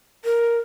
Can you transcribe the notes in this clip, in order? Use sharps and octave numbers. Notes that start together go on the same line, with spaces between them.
A#4